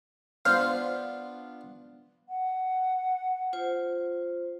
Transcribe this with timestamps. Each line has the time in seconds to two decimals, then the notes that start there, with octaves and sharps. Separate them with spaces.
0.45 B3 D4 F4 C5 F5
2.29 F#5
3.53 F4 C5